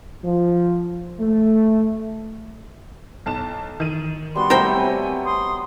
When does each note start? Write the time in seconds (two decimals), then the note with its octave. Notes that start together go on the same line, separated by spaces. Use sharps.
0.25 F3
1.20 A3
3.26 B1 A5 E7
3.80 D#3 D#7
4.36 G3 B3 F#4 C6
4.50 C3 A3 A#4 C5 G5
4.74 F#3 G#5
5.24 C6 D#6